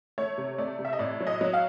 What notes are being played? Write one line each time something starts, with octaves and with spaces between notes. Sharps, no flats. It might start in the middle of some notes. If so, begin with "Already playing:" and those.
A3 C#5
C3
A3 D5
C3
E5
D#5
A2 D5
F#3
D#5
F#3
F5